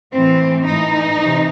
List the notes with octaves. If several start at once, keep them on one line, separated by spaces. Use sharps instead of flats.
A2 E3 C4
A2 E3 D#4
C3 E3